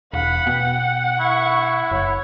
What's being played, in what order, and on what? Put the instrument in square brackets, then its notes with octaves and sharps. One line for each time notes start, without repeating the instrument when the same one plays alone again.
[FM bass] E1 [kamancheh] F5 B5 [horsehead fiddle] F#5
[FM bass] B2 [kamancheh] G5
[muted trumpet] E4 [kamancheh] C#6
[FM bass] F#1 [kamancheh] C#5